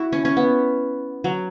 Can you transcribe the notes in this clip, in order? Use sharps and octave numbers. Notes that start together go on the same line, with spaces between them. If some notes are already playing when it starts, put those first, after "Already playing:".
Already playing: E4 F#4
C#4
C#4
B3
F#3